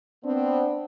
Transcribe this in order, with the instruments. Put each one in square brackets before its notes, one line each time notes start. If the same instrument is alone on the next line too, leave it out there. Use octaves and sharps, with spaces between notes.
[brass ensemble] B3 C4 [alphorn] D4